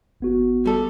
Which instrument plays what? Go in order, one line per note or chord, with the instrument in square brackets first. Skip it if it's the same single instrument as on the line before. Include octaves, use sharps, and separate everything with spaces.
[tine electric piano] G1 B3 F#4
[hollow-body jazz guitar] G3 A4